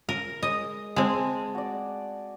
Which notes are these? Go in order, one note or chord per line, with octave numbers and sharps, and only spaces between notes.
A#4
G#3 D#5
G#3 C4 D#5 G#5 A5
F#4 D5